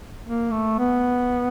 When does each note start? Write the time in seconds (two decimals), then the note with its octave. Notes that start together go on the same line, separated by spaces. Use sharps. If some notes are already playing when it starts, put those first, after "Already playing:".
0.24 A#3
0.51 A3
0.78 B3